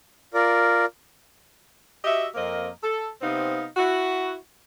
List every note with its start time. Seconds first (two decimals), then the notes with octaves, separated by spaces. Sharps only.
0.34 F4 A#4 D5
2.05 F#4 G4 D#5 E5
2.35 F2 A#3 C4 A#4 D#5
2.83 A4
3.22 C3 B3 C4 D#4 F5
3.76 E4 F#4